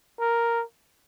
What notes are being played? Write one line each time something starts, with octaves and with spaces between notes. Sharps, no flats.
A#4